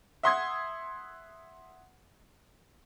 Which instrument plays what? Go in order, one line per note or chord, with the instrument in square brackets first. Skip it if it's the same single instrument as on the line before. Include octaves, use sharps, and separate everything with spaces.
[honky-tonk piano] E5 F#5 C6 D#6 G#6